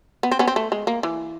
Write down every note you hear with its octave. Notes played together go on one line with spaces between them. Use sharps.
B3
C4
B3 C#4
C4
A3
G#3
A#3
E3